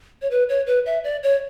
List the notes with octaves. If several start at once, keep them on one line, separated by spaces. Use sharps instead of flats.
C#5
B4
C#5
B4
E5
D5
C#5